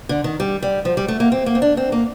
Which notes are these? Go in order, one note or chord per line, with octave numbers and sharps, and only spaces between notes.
D3
D#3
G3
G3
F3
G3
A3
A#3
C4
A#3
C4
D4
C4
A#3